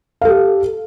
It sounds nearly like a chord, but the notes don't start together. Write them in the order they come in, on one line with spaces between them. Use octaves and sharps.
F5 A4 G4